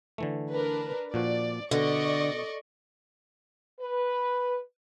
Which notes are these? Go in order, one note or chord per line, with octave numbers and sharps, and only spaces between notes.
D3 E3 A3
D4 A#4 B4
A#2 F3 F#4 D5
B2 D3 D5 D#5 C#6
B4